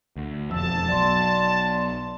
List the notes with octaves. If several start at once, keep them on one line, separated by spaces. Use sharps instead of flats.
D2
E1 F2 A5 E6
B1 F#3 D5 C6